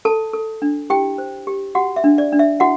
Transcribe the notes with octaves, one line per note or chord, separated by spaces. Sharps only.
A4 A5
A4
D4
E4 G4 G5
C5
G4
F#4 G4 F#5
E5
D4
D5
D4
E5
E4 F#4 F#5